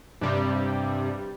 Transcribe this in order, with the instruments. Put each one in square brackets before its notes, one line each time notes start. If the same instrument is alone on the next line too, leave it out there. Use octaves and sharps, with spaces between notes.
[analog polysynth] G2 C3 G3